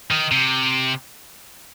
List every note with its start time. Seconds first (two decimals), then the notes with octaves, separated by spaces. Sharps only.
0.11 D#3
0.32 C3